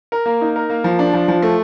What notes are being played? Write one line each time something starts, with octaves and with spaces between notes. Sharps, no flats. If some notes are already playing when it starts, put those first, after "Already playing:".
A#4
A#3
D#4
A#4
A#3
F3
D4
F3
F3
A3